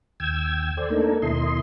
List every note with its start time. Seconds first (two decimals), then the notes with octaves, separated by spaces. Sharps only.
0.20 D#2 G5 E6 G#6
0.77 A4 C5 D5 G#5
0.90 A3 A#3 D4 D#4 A4 A#4
1.22 D#2 B2 E4 D#5 C6